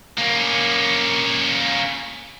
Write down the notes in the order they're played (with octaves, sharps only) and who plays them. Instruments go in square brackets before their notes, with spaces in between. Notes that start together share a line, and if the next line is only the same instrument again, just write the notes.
[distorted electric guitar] A#3 C#4